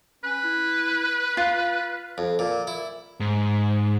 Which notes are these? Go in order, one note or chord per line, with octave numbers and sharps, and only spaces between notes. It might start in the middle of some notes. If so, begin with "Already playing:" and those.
C#4 B4
E4
F4 F5
F2
A#2
E4
G#2